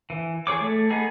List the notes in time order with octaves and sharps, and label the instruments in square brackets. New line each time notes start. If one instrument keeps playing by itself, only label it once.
[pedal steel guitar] E3
G#4 C#5 D6
A3
B3 D#4 G#4